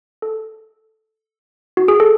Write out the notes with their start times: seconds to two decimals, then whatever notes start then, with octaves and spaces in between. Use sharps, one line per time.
0.22 A4
1.77 F#4
1.88 G#4
2.00 A4